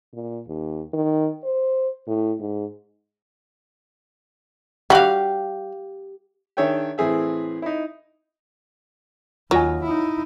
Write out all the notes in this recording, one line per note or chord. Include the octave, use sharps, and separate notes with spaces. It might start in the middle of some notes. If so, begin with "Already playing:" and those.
A#2
D#2
D#3
C5
A2
G#2
G3 F#4 G4 F5
D#3 D4 G#4 C#5 E5 G5
A2 E3 C4 G#4 E5
D#4 E4
D#2 F#3 F4 D#5 G#5
D#4 E4